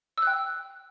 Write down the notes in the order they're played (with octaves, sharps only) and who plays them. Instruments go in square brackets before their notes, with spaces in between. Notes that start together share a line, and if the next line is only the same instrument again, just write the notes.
[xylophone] E6
F#6
G5